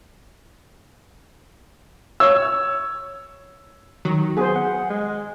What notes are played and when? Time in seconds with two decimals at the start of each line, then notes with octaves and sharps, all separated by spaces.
2.20 C#5 E6
4.05 D#3 F#3
4.37 B3 G#4 C5
4.55 F#5
4.90 G#3